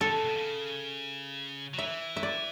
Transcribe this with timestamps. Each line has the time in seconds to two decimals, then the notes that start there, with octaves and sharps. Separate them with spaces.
0.01 D3 A4
0.13 C#3
0.24 B2
0.37 C#3
1.74 F#3
1.78 E3 E5
2.17 E5
2.23 D5